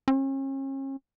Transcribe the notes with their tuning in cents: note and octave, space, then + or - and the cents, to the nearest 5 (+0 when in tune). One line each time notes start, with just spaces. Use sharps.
C#4 -40